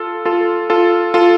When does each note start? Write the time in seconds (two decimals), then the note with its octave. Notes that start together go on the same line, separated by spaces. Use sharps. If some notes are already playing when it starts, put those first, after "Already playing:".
Already playing: F4 A4
0.25 F4 A4
0.70 F4 A4
1.14 F4 A4